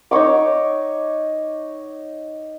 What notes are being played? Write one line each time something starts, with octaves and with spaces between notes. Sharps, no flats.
D#4 C#5 C#6 D6